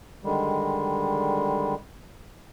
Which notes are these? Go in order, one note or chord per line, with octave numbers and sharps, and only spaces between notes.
D3 D#3 G3 G#3